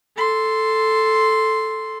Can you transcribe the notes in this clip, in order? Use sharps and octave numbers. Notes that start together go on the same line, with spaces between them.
A4 C6